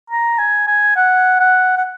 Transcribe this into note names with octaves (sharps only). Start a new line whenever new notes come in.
A#5
G#5
G#5
F#5
F#5
F#5